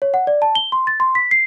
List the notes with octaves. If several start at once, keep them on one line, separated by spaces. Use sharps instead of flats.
C#5
F#5
D5
A5
G7
C6
A6
C6
B6
C7